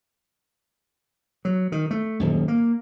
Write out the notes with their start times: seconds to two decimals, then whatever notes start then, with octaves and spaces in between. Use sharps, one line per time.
1.45 F#3
1.72 D#3
1.91 A3
2.20 D#1 G#1 F#2
2.48 A#3